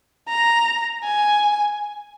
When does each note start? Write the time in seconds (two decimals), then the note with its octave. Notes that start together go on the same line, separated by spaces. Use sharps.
0.29 A#5
1.04 G#5